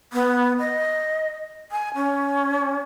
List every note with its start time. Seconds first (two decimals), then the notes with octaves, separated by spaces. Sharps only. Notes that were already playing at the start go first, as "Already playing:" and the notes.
0.13 B3
0.59 D#5
1.72 G#5
1.95 C#4